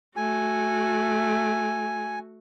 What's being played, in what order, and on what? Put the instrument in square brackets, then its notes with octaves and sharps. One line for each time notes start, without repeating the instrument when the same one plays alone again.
[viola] A3 F#4 [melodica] G#5